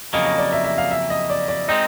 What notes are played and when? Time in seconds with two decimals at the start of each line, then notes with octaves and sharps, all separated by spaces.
0.13 F2 C#3 F#3 A#3 D#5
0.26 D#5
0.38 D5
0.53 E5
0.64 E5
0.78 F5
0.91 E5
1.10 D#5
1.30 D5
1.48 D5
1.68 G#3 C4 D#4 D#5